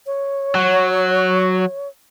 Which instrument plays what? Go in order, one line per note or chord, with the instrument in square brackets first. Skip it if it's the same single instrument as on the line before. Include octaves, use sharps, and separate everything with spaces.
[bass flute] C#5
[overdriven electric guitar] F#3